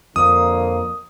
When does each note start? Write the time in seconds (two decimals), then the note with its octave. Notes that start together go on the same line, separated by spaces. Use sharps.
0.16 F2 D3 F3 A#3 D#6